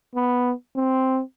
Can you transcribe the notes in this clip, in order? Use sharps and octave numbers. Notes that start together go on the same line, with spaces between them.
B3
C4